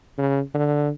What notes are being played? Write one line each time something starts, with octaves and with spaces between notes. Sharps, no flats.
C#3
D3